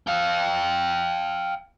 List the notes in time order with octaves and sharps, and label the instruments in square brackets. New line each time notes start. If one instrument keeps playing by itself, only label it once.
[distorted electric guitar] F5 G5